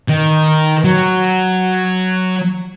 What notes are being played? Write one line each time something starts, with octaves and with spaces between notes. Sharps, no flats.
D#3
F#3